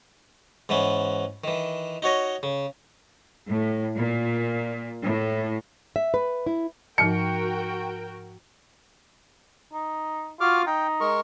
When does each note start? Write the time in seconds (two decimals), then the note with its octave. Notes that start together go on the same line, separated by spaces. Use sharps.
0.69 G#2 E3 B3 C#4
1.44 D#3 E3
2.02 D#4 F#4 C#5 D#5
2.43 C#3
3.50 A2
3.95 A#2
5.03 A2
5.96 E5
6.14 B4
6.46 E4
6.98 G#2 F3 D#4 F#4 A#4 G5 C#7
9.73 D#4
10.41 F4 F#4 D6 F6
10.67 D#4 G5
11.00 G#3 A#4 C#6